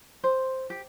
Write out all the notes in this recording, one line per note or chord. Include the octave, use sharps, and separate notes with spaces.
C5
G4